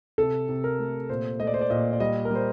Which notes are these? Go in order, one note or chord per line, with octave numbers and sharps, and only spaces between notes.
C3 A4
C3
A#4
A3
A#2 C5
A3 D#5
D5
C5
D5
A#2 D#5
D5
G3 D#5
A#4
G3 C5